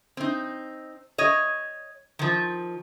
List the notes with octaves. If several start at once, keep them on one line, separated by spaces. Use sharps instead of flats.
C4 D#4
C#5 D#5
D#3 F3